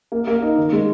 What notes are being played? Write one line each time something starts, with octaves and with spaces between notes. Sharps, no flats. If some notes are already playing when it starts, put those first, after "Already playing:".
A#3
A#3
D#4
D#3
G#3